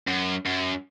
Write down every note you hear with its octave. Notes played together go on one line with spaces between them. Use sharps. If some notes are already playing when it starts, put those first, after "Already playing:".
F#2
F#2